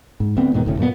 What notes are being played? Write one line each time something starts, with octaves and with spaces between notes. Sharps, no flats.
G#2
D2 D3 B3 C4
D#2 G#2 B2 D#3
F1 D2 A2 C#3
F#2 A#2 F3 B3